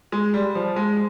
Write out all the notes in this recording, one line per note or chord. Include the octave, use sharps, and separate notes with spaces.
G#3
G3
F3
G#3